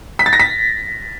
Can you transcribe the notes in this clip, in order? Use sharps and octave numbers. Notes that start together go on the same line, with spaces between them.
B6
A6
A#6
B6